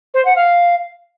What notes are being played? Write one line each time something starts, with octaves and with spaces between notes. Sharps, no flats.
C5
F#5
F5